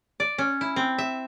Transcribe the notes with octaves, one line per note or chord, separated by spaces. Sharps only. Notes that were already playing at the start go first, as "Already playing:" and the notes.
D5
C#4
E4
C4
E5